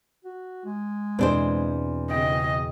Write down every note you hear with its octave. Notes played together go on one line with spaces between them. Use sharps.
F#4
G#3
E2 B2 C4 D4 C5
C#3 D#5 G5